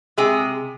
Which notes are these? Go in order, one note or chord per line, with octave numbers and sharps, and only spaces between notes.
C3 G#3 G#4